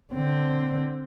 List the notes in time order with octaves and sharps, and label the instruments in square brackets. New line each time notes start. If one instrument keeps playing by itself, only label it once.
[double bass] D3 C4